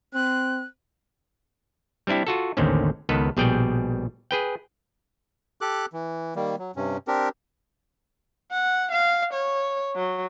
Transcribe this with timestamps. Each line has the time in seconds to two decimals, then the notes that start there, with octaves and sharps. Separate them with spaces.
0.14 C4 F#6
2.07 G3 C4 D4 E4 G4
2.27 F4 F#4 A4
2.57 A1 D#2 D3 D#3 C4 C#4
3.09 C#2 D#3 B3 A4 B4
3.37 A#1 B2 G3 G#4 D5 G5
4.31 G#4 B4 G5
5.61 G4 A4 D6 F#6
5.93 E3
6.36 D#3 G3 A#3
6.59 F#3
6.76 G2 C3 C#4
7.08 C4 D4 G4 A#4
8.51 F#5
8.91 F5
9.33 C#5
9.95 F#3